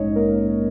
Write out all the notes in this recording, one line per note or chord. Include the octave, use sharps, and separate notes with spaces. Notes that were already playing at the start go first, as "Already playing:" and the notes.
Already playing: A#1 G#2 G#3 C#4 D#4 C#5 D#5
A#3 A#4